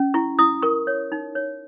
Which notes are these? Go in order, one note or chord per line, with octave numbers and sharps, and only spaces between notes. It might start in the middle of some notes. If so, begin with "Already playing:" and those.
Already playing: C#4
E4 C#6
E4 D#6
A#4 C#6
C#5
D#4
C#5